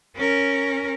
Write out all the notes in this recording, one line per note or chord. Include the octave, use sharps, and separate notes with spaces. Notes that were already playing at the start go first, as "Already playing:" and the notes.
C#4 A#4